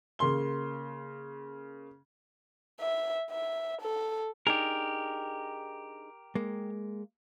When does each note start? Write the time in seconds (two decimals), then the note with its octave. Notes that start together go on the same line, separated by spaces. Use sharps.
0.19 C#3 A#3 C6 G7
2.80 E5
3.31 E5
3.81 A4
4.47 D4 D#4 G4 G#4 A#4
6.35 G#3 A#3